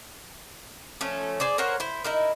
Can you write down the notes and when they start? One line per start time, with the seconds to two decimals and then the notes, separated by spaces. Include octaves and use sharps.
1.01 F3 A3 C#4
1.40 G#4 C5 D5
1.58 A#4 C5 C#5 F#5
1.80 E4 C5
2.04 D#4 E4 A#4